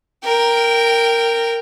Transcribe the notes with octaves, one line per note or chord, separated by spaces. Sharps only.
A#4 G5